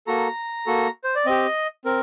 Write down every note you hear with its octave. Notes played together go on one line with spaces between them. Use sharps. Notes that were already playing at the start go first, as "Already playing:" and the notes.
A#3 F#4 A4 A#5
A#3 F#4 A4
C5
D5
C4 G4 D#5
C4 A#4